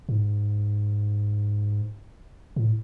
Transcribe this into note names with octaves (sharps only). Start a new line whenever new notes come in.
G#2
A2